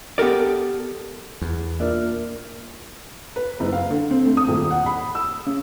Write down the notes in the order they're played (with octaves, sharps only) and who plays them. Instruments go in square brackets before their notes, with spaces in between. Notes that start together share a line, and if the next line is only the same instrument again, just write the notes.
[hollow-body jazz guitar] B3 G4 A4 A#4 D5
[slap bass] E2
[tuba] A#2 [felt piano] D4 D5 E5 [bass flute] A#4
[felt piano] B4
F#1
F5
D3
C4
A3
D#6
D#1
F#5
B5
E6
C#3